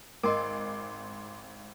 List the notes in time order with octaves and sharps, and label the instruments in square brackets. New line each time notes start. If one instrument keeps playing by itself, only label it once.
[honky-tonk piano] G#1 [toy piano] A#4 D#5 [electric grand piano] C6 D6